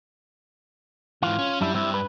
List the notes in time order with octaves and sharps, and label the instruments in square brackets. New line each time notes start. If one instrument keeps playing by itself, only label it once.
[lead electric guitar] G#2 E3 [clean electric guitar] F4
[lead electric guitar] C#4
[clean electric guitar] F#2 D4 E4 [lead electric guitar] G3
[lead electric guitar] G2 [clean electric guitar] C4 E4
[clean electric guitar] B4